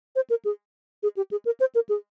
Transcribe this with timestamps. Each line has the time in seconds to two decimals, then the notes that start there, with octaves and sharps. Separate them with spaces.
0.16 C5
0.30 A#4
0.45 G#4
1.03 G#4
1.17 G4
1.31 G#4
1.45 A#4
1.60 C5
1.75 A#4
1.89 G#4